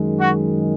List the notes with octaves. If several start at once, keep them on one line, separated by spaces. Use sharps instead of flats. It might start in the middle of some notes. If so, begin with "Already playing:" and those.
Already playing: F#2 D#3 G#3
F#4